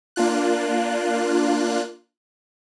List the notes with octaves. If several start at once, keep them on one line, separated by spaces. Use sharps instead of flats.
A#3 D4 F4 F#6